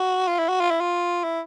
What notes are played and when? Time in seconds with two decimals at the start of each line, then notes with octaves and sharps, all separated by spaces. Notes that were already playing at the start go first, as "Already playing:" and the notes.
Already playing: F#4
0.28 F4
0.39 E4
0.49 F#4
0.61 F4
0.70 E4
0.80 F4
1.24 E4